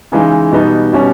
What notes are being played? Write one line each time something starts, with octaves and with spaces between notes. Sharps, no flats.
C#3 E3 G#3 D#4
B2 G3 B3 D#4
B2 G3 C#4